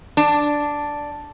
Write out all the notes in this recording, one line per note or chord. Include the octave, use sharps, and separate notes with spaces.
D4